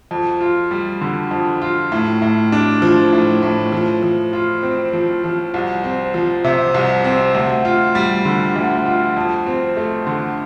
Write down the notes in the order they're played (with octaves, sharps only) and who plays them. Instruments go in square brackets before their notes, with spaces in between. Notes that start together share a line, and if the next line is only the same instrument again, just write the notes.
[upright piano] F2
F4
G3
D3
F2
F4
A2
A2
D4
F3
A2
A2
F3
F3
F4
C4
F3
F3
C2
C4
F3
C3
C2
C4
D2
F4
G3
D3
D2
F4
F2
C4
A3
D3